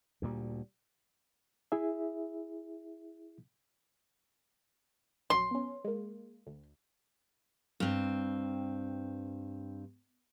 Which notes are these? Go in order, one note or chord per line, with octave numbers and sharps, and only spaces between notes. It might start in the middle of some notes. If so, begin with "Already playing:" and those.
D2 A#2 G3
E4 G#4 E5
A#1 F#2 F#3 C6
B3 C#4
G#3 A#3
D2
G2 C4